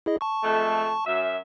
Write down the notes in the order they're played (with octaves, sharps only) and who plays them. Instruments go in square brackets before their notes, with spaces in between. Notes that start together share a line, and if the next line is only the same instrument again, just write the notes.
[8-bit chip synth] E4 G#4 D#5
A5 C#6
[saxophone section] F2 G#3 A3
F#2 E5